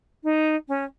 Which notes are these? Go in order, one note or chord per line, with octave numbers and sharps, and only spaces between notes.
D#4
C#4